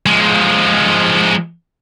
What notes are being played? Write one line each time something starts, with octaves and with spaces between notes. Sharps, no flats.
F3 G#3